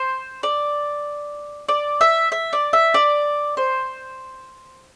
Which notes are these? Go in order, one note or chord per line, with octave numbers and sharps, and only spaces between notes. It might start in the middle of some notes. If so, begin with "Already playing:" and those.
Already playing: C5
D5
D5
E5
E5
D5
E5
D5
C5